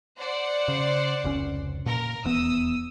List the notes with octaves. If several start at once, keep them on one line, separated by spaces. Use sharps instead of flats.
C5 D5 F#5
C#3
F1 C#2 C#4
A#2 A#4
D#1 E2 B3 D#6 E6